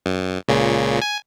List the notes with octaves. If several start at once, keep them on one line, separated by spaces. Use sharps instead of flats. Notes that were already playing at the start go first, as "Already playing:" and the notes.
F#2
C#2 A#2 C#3
G#5